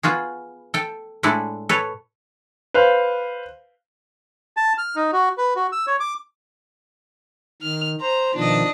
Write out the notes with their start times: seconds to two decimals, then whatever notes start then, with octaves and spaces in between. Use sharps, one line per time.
0.03 B3 F4 F#4 G#4
0.74 A4 G5
1.23 A2 G#3 D4 E4 A4
1.69 A4 B4 C#5
2.74 B4 C5 F5
4.57 A5
4.78 F6
4.96 D#4
5.13 F#4
5.38 B4
5.56 F#4
5.72 E6
5.87 C#5
6.00 D6
7.62 D#3 F6
8.01 C5 A#5
8.35 B2 D#3 F3 D4 D#5